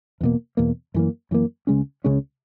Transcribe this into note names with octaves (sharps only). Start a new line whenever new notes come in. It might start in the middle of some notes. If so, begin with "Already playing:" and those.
E2 B2 A#3
E2 B2 A#3
F#2 E3 A#3
F#2 E3 A#3
C#2 C#3 G#3 C#4
C#2 C#3 G#3 C#4